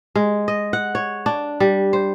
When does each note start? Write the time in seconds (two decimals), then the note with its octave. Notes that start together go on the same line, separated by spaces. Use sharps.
0.15 G#3
0.48 D#5
0.73 F#5
0.95 C#5
1.26 D4
1.60 G3
1.93 C5